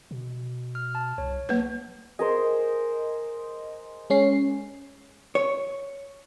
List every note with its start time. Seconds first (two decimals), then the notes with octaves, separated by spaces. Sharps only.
0.11 B2
0.75 F6
0.95 A5
1.18 C2 C#5
1.49 F#3 A#3 B4
2.19 G#4 A#4 C5 D#5
4.10 G#3 C#4 C7
5.35 C#5